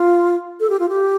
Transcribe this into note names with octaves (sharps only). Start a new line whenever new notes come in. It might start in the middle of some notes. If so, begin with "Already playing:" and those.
Already playing: F4
A4
G4
F4
G4